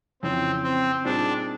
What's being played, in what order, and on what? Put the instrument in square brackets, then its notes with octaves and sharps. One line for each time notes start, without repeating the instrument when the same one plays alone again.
[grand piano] F2 C#3 E3 [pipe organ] C4
[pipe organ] C4
[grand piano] A#2 G3 C4 D#4 G#4 [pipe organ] D4